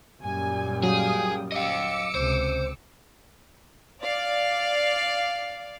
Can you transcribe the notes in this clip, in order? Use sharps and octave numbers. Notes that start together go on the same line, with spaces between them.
F#2 A#2 G3 G#5
F#3 G#4 F5 G5 D#6
D#5 F5 D6 E6 C#7
C#2 C3 C5
D5 F5